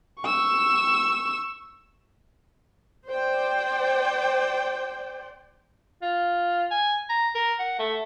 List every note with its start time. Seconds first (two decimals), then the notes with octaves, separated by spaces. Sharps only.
0.21 C#6 E6
3.08 C5 D5 G5
6.02 F4
6.71 G#5
7.09 A#5
7.35 A#4
7.59 F#5
7.79 A3